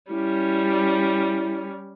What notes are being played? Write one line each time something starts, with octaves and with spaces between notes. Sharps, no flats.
G3 C#4 E4